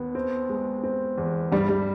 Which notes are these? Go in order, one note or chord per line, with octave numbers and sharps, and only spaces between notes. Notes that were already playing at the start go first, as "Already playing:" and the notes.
Already playing: D#2 B3
C4
G#3
C4
E2
G2 G3
G3